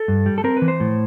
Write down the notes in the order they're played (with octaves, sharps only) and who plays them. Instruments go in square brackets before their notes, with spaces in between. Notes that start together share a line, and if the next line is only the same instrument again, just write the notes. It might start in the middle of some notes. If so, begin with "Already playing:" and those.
Already playing: [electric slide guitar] A4
G2
G3
A4
C4 A#4
B4
E3
C5
A2